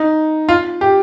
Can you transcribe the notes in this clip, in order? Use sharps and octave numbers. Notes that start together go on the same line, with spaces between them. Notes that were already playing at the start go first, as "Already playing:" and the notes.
Already playing: D#4
F4
G4